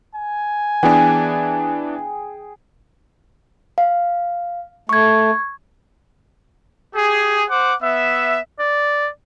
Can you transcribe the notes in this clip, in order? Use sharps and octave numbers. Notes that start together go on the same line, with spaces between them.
G#5
E3 B3 D4 G#4 G5
F5
A3 C#6 G#6
G4 G#4
C5 F#5 D6
B3 E5
D5